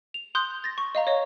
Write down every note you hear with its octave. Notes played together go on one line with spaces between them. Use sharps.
F7
C6 D#6 F#6 G6
A6 A#6
C#6
D#5 F5 A#5
C#5 D#5